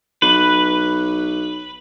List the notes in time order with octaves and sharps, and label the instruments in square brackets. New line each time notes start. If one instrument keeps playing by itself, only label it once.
[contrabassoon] B1 [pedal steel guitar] B4